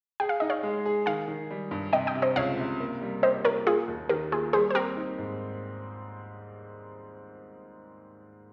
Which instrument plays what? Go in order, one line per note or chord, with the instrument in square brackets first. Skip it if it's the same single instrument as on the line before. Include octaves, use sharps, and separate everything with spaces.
[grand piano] G#4 [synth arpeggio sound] G5
[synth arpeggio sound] F5
[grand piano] D#4 [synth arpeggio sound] D#5
[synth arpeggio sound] C#5 F5
[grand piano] G#3
G#4
[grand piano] D#3 [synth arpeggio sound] F5 G#5
[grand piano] D#3
G3
G2
[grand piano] C3 [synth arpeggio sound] D#5 G5
[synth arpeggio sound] D#5 G5
[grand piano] C3
[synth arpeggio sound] C5 D#5
[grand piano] C#2 [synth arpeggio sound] C#5 F5
[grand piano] C3
A#3
G3
[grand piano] G4 [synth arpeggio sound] C5 D#5
[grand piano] A#3 [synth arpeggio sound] A#4 C#5
[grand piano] A#3 [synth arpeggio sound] F4 G#4
[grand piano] D#2
[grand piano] D#3 [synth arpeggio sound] G4 A#4
[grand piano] A#3 [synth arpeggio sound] F4 G#4
[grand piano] G3 [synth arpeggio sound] G#4 C5
[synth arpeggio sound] C5
[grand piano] C4 [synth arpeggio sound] G4 A#4
[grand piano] D#4
G#2